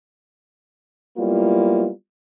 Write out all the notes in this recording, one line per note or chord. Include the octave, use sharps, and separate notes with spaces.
F#3 G3 A#3 B3 E4 F4